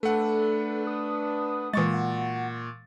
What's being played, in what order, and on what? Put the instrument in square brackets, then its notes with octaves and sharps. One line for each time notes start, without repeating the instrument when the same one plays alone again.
[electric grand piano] A3 F#5 [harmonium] D4 B4 [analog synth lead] A4
[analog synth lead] D#6
[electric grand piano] A#2 C#6 A6 [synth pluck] E3 G#3 [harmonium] F#4
[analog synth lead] F#5